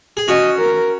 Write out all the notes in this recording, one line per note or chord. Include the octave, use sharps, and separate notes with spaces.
G#4
C#4 F#4 D#5
A#4